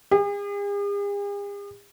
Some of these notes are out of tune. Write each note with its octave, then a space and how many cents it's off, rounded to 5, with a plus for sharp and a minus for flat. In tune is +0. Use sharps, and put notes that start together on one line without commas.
G#4 -45